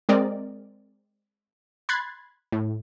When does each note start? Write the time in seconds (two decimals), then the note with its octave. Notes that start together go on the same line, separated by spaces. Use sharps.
0.09 G#3 C4 A#4 D5 D#5
1.89 B5 C6 F#6 G#6 A6 C7
2.52 A2